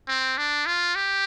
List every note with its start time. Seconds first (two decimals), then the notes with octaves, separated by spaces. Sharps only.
0.08 C4
0.37 D4
0.66 F4
0.95 G4